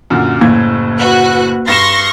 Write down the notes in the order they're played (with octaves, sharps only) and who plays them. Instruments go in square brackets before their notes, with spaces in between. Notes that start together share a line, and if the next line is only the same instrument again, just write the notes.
[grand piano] F#2 A#2 D3
[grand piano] F#1 A2 G#6 [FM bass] A#3
[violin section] F#4 B4 F#6
[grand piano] G2 E7 [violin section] C6 C#6 A#6